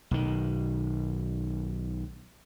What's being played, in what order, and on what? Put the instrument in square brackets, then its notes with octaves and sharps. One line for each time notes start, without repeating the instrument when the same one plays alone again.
[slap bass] B1 D#3